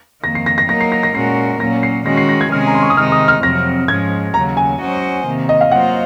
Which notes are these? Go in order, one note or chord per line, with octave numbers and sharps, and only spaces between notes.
F2 D#3 A#3 A#6
C7
A#6
A#6
F#3 A#3 D#4 A#4 A#6
C7
A#6
A#6
A#2 G#3 C#4 F#4 A#4 C7
A#2 F#3 A#3 C#4 A#6
C7
D#3 G#3 C#4 F#4 A#6
C7
A#6
G#6
C3 D#3 G#3 C#4 G#4 F6
A#5
C6
C#6
D#6
C3 D#3 G#3 D#4 F6
D#6
F6
F2 C3 F#3 C4 A#6
G#2 F3 G#3 C#4 G#6
D#2 C#3 F#3 A#5
G#5
F#3 C#4 F#4 C5 D#5
C3 D#3 A#3
D#5
F5
F#3 A#3 F4 C5 F#5